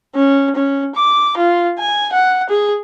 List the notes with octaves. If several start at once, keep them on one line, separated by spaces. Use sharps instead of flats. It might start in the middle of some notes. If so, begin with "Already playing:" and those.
C#4
C#4
D6
F4
G#5
F#5
G#4